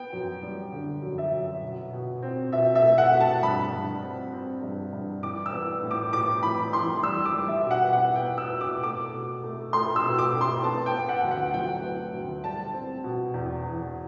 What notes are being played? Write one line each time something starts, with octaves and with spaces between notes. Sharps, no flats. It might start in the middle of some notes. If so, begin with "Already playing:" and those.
Already playing: B3 G5
F#2
G3
D3
F#2
E5
F#2
B2
B2
C4
B2 E5
E5
A3
F#5
B2
A5
G2 B5
G2
C4
C4
G2
G2
E3 D6
E6
B3
A2
D6
A2 D6
E3 B5
E3 C6
G3 E6
D6
G3
E5
B2
F#5
B3 F#5
G5
B3
E6
B2
D6
A3 D6
B2
A3
A3 C6
E6
B2
D6
A3
C6
B3 A5
G5
B3
F#5
D2
F#5
F#3 G5
B3
D2
G3 A5
C4
B2
E2
E2